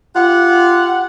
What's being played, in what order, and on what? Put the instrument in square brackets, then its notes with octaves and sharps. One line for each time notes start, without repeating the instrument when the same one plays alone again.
[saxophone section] F4 G4 F#5